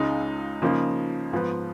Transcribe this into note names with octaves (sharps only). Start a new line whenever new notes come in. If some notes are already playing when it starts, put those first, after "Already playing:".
Already playing: C#2 C#3 G#3 D#4
C#3 F3 A#3 D#4
G#2 F3 B3